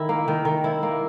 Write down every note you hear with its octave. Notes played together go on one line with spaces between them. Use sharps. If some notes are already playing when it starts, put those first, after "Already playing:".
Already playing: D#3 E4
A#3
D#3
D#3
E4
A#3